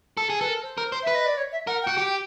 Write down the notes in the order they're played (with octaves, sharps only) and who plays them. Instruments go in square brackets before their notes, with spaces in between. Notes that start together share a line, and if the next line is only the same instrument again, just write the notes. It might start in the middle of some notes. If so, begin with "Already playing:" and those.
[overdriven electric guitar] A4
G#4
[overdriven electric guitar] A4 [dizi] B4
[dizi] A#4
C5
[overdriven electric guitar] A#4
C5
[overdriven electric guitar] B4 [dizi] E5
[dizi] D#5
D5
C#5
E5
[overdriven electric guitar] A#4 [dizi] F#5
[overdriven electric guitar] F#4 [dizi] G5
[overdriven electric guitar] G4